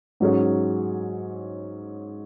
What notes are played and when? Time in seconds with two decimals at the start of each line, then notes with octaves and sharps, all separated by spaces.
0.20 G#2 F#3 C#4 G#4 C#5